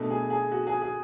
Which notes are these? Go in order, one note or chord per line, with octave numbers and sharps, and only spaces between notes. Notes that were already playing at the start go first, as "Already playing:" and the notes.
Already playing: B2 A3 D4
G#4
G#4
F#4
G#4
G#4